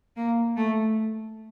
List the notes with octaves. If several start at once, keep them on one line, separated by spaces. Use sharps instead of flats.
A#3
A3